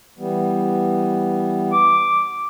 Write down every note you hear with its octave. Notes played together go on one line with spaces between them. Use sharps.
E3 G3 B3
D6